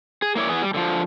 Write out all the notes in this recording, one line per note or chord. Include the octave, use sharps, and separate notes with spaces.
G#4
A#3 E4 C#5 D5
E2 B3 G#4
G3
D3 F3